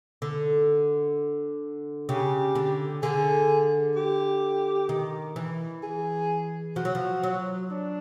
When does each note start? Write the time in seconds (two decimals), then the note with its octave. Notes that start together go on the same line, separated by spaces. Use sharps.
0.22 D3
2.09 C#3 G4
2.55 D3
3.03 D3 G#4
3.96 G4
4.89 D#3
5.36 E3
5.83 G#4
6.76 F3 F#4
6.85 F#3
6.95 F3
7.23 F#3
7.71 D4